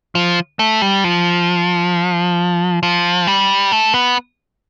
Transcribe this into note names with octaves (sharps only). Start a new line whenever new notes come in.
F3
A3
G3
F3
F3
G3
A3
B3